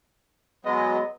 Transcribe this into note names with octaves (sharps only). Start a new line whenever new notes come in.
F#3 G#3 B3 D#5